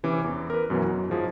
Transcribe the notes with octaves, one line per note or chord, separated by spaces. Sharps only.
C3 E3 C#4 D6
E2
A#4 B4
F#2 B2 E3 F#3
F#3
G#2 F3 G#4